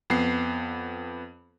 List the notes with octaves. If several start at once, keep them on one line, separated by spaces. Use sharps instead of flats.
F2 B3 C7